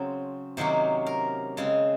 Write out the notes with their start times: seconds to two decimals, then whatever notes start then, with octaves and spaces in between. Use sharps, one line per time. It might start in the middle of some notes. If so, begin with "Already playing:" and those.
Already playing: C#3 F#3 C4
0.57 C3 D#3 F#3 A#3 C#4 C5
1.06 A#4
1.57 C#3 G#3 C4